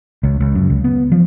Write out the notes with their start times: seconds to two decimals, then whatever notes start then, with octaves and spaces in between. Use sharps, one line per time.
0.23 C#2
0.40 C#2
0.55 F#2
0.70 C#2
0.84 B3
1.12 F3